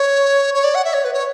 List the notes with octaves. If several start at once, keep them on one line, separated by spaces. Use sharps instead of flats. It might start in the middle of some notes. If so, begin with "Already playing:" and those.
Already playing: C#5
C#5
D5
F#5
E5
C#5
B4
C#5